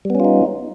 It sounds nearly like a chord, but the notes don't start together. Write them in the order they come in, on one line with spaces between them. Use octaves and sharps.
G3 B3 C#4 F4 D#4